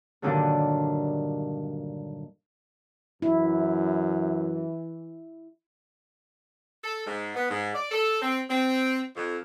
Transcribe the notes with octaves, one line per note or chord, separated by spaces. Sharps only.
G2 A#2 D3 D#3 F#3 G3
F#2 E3 E4
A4
G#2
B3
G#2
D5
A4
C4
C4
F2